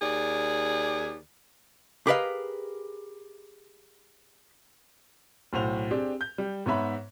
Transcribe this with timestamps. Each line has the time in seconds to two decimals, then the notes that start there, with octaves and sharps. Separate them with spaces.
0.02 D#2 G#4 D5
2.07 G4 G#4 A#4 B4 D#5 F5
5.53 B1 A2 F#4 C5 F7
5.91 C4 D4 G4 G#4
6.21 G6
6.38 G3
6.66 G#2 B3 C#5 E5 B5